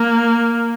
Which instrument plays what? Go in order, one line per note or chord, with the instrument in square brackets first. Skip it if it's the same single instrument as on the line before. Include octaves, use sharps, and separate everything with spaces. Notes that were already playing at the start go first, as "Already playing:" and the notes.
Already playing: [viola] A#3